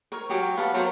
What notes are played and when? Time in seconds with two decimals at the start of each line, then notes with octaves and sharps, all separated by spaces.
0.12 A#4 C#5
0.30 F#3 G4 G#5
0.57 B3 F5 A5
0.74 F#3 A#4 C5 C#5